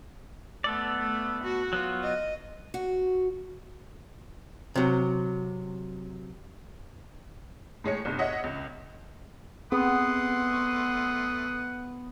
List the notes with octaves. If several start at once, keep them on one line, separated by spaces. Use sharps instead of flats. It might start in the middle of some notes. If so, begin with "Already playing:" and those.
A3 B3 A4 D5
A3
F#4
F#3 B3 F4
D#5
F#4
C3 F#3
A2 G#3 C#5 C#7
G1 C2
C#5 D#5 E5 F#5
C#2
A3 B3 C4 G#4 F#5 C6 D#6
C#6